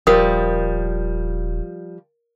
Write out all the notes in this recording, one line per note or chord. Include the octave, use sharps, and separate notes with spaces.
D#1 F3 G3 A#4 D#6